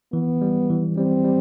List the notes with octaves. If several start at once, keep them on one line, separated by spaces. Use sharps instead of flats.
E3 B3
G3
E3
G3 C4
G3